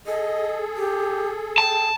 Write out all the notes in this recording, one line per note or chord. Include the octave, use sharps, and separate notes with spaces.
G#4 A4 D#5
G4
G5 A5